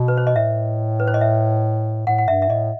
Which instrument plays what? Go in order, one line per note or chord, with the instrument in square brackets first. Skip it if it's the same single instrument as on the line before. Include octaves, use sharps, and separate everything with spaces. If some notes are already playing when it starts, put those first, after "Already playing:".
Already playing: [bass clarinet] B2
[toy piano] B4
C5
D#5
[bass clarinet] A2 [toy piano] E5
[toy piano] B4
C5
D#5
E5
[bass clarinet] A2 [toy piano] F#5
[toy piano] F#5
[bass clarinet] G2 [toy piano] E5
[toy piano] E5
[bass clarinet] A2 [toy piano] D#5